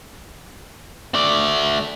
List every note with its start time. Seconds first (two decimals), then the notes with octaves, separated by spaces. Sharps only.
1.14 A3 D5